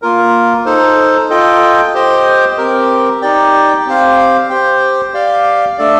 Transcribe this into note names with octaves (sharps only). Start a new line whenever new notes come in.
A#3 F4 A#4
D#4 A4 C5
F4 A4 D#5 G5
G4 C5 D#5 G5
C4 G4 A#4
D#4 G4 D5 G5
C4 G4 C5 F5
G4 C5 G5
G4 D5 F5
A3 D4 A4 D5